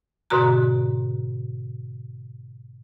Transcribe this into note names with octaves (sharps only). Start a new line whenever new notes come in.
G#2 B2 D3 F#4 A#5